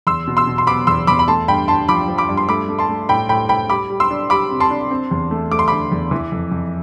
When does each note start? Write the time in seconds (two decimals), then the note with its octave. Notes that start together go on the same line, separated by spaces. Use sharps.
0.07 E2 C6 E6
0.27 B2
0.37 C6 E6
0.47 B2
0.58 C6
0.67 B3 B5 D6
0.87 E2 C6 E6
1.07 E2 B5 D6
1.19 B5
1.28 A3 A5 C6
1.48 G2 G5 B5
1.68 G2 A5 C6
1.88 F3 B5 D6
2.08 F3
2.18 B5 D6
2.29 G2
2.37 C6
2.48 A3 B5 D6
2.69 A3
2.79 A5 C6
2.89 A3
3.09 A2 G5 B5
3.29 A2 G5 B5
3.49 A2 G5 B5
3.70 G3 B5 D6
3.90 G3
4.00 C6 E6
4.10 D4
4.30 G3 B5 D6
4.51 C3
4.60 A5 C6
4.70 D4
4.91 C4
5.11 E2
5.31 A3
5.51 A3 D6
5.59 C6
5.68 D3 B5 D6
5.92 E2
6.11 E3
6.32 F2
6.52 F2